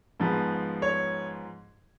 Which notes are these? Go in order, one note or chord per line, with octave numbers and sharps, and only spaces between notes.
G#2 F3 B3
C#5